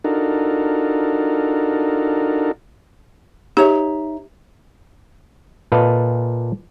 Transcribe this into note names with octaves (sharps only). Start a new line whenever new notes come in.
D4 D#4 F4 F#4 A4 A#4
D#4 G4 C#5 E5
A#2 A4 B4 D#5 F5